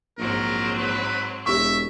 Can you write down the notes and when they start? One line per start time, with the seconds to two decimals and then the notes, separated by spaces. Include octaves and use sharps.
0.18 A#1 G#2 F#3 C4 A#4
0.78 B4
1.46 E1 G4 E5 C#6